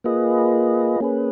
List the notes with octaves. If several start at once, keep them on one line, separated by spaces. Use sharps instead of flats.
A#3 F4 G#4 B4 D#5
A#3 C#4 G#4 B4